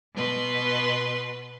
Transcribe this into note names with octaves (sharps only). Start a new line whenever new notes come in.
B2 B4 C6